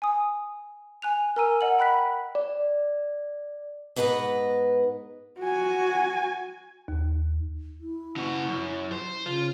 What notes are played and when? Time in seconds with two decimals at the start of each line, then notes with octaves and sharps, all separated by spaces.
0.02 G#5 D#6
1.02 G#5 F#6 F7
1.36 A#4 G#5 A#5 E6 D#7
1.61 D#5 F#5 E6 F#7
1.79 G5 B5 F#6 B6
2.35 D5
3.96 G#2 B3 B4 D#5 A#5
5.40 F#4 G#5
6.88 D#2
7.81 E4
8.16 C#3 F#4
8.48 F#2
8.92 C5
9.26 C#3 F4